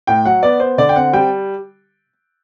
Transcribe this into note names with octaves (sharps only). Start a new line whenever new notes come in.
A2 G5
F#3 F#5
B3 D5
B3 C5
D3 D5
G5
C4 F#5
G3 G5